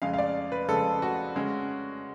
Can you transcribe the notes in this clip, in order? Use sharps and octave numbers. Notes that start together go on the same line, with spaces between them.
F2 C#3 G#3 F5
F5
D5
B4
F2 C#3 G#3 A4
F#4
C#3 G#3 C#4